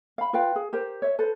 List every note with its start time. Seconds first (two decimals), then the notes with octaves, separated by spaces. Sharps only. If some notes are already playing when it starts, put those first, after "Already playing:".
0.18 F5 B5
0.33 F4 B4 F5 G5
0.56 G#4
0.73 G4 A#4 C5
1.02 C#5 E5
1.18 A4 B4 C5